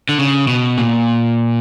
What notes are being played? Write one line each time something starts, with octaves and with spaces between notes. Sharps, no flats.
D3
C#3
B2
A#2